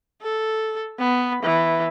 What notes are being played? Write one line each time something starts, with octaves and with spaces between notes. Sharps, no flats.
A4
B3
E3